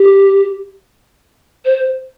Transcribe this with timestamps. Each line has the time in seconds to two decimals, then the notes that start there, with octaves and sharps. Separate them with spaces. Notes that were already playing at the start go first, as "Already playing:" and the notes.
Already playing: G4
1.65 C5